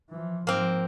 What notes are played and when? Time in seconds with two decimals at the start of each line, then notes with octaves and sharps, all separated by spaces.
0.10 E3 F3
0.47 G#2 F3 A#3 C4